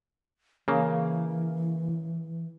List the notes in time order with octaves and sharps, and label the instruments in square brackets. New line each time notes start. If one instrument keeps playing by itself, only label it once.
[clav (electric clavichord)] C#3 A#3 [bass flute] E3